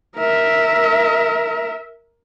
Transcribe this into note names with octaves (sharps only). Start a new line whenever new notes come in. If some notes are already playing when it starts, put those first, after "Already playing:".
A#4 E5